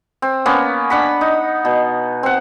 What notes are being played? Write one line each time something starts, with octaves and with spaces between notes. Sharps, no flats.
C4
A#3 B3 C#4
D4 F#5 B5
D#4
B2
C4 F#5